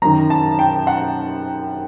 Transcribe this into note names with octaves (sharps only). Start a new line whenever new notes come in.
F#2 D#3 A#5
A5
G5
F#5